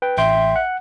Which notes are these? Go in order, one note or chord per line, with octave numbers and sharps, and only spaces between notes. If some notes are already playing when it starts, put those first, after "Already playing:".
B4 G5
A1 E5 G5 C6
F#5